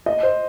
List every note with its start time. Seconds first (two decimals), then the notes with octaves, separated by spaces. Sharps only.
0.06 D#5
0.23 C5